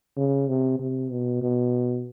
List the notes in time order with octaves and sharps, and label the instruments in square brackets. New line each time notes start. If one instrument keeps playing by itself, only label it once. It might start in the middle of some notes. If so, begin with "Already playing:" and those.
[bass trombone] C#3
C3
C3
B2
B2